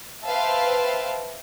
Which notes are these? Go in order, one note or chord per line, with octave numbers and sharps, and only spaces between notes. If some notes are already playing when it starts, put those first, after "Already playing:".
B4 C5 E5 F5 G5 A5